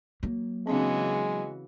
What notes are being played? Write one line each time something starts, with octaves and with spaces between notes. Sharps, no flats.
F#3 A#3
C#3 E3 G#3 C4 D4 F#4